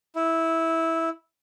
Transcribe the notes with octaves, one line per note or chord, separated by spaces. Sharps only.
E4